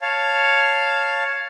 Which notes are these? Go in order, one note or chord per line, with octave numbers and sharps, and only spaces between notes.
C#5 F5 A5